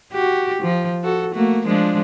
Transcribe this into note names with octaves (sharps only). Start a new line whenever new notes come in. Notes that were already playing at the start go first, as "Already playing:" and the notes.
F#4 G4
F3
F#4 A4
A3 A#3 F#4
F3 G#3 D4